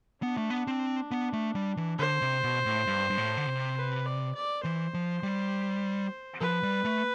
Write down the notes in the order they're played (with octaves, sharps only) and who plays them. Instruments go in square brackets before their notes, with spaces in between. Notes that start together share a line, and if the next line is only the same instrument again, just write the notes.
[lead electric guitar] B3 [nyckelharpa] D4
[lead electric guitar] A3
B3
C4
B3
A3
G3
E3
[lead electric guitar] D3 [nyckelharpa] C5
[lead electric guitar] C3
B2
A2
G2
G2
A2
D3
C3
[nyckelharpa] B4
D5
D5
[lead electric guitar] E3 [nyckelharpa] C5
[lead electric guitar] F3
G3
[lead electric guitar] F3 [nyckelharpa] B4
[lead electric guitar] G3
A3